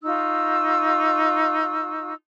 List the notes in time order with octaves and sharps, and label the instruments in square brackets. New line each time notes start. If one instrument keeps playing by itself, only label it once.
[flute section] D#4 F4 C#6 E6